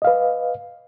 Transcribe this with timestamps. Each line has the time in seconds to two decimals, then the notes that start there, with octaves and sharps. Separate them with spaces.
0.02 D#5
0.04 F5
0.07 B4